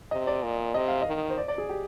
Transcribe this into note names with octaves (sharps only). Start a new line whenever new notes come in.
C3 D#5
D5
A#2
C3 D#5
F5
D#3 D#5
C5
D5
D5
G#4
G4